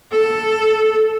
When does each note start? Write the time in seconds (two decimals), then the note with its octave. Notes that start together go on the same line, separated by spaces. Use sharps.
0.12 A4